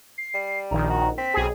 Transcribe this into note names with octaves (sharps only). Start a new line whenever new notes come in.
C7
G3
A#1 D#3 A#5
F#4
C4 B6
B1 G#4